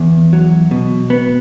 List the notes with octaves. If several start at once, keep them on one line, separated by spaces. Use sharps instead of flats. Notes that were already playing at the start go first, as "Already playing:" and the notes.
Already playing: E2
F#3
B2
B3